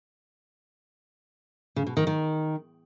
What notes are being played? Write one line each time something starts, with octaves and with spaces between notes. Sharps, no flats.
C#3
B2
D#3
D#3